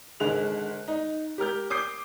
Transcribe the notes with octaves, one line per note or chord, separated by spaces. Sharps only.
G#1 D3 G#3 F#6 F7
D#4
G4 A#4 F6 G6
D6 D#6 G6 C7